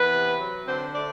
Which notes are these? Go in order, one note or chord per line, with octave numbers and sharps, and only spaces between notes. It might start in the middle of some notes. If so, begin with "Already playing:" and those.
Already playing: E3 B3 B4
C3
F#3
D3 C4 C5
A3 D4 D5